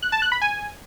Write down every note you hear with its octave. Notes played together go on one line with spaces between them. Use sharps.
F#6
A5
F#6
B5
G#5